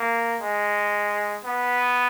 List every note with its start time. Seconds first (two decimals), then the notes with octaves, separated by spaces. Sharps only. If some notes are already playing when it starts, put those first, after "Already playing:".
Already playing: A#3
0.41 G#3
1.45 B3